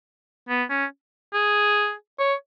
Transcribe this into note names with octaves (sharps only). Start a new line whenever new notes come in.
B3
C#4
G#4
C#5